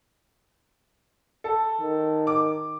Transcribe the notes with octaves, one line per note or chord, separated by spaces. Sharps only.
A4
D#3
D6